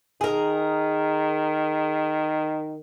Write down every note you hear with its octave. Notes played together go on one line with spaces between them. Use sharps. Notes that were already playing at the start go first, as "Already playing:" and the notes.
D#3 G#4 A#4